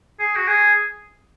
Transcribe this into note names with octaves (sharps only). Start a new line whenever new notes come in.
G#4
F#4
G#4